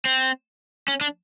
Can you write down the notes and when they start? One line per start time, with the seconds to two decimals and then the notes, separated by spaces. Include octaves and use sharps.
0.05 C4
0.88 C#4
1.01 D4